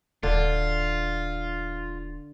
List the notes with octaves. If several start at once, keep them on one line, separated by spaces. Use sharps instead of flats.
D#1 D3 F4